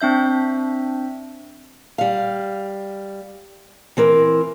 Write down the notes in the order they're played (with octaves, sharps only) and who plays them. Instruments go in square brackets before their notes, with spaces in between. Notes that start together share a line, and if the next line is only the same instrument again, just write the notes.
[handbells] C4 D4 E5 G6
[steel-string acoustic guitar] G3 F5
E3 C4 A#4